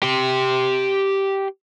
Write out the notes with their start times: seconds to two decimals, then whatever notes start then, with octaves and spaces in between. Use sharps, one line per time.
0.03 G4 C6